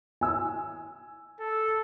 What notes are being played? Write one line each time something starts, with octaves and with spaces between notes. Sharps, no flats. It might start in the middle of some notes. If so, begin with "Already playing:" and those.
G#5 E6
A4